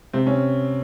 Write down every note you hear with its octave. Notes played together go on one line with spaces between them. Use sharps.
C3 C4
C#4